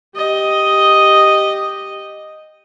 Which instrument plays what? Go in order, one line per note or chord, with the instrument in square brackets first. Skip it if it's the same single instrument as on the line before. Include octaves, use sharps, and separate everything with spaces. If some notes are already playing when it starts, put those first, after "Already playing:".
[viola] G4 D#5